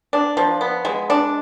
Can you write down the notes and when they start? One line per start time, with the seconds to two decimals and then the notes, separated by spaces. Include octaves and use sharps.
0.13 D4
0.37 F3
0.61 B3
0.85 G#3
1.10 D4